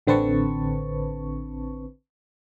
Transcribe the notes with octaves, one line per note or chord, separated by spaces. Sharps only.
A1 D3 C4 B4 A5 C#6